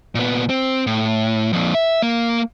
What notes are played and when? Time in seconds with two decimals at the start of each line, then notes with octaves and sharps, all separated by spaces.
0.15 A#2 B3
0.49 C4
0.87 A2
1.53 F2 A#2
1.74 E5
2.02 A#3